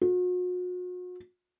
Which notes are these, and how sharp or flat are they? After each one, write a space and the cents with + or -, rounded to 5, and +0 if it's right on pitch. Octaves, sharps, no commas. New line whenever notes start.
F#4 -40